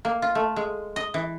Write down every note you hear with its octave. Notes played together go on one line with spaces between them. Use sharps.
A#3
F4
A3
G#3
D#5
E3